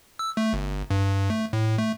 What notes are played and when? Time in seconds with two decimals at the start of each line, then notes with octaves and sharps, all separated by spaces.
0.19 E6
0.37 A3
0.53 G1
0.90 G2
1.30 A3
1.53 A2
1.78 A3